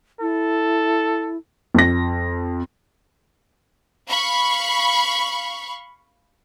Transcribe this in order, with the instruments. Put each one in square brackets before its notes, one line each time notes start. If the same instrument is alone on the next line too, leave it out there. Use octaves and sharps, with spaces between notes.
[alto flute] E4 [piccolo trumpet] A4
[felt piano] F2 A#6
[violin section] F5 B5 C#6